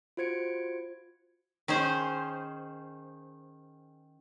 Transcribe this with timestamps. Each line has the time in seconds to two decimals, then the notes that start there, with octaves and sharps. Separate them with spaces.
0.17 F4 F#4 C5 G#6 C#7 D7
1.68 D#3 C#4 G#4 C5